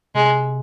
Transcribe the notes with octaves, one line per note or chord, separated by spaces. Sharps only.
C3 G#3